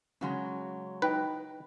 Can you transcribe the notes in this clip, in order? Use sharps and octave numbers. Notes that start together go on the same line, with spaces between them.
C#3 F#3 G#3 C#4
D#4 B4 G5 A#5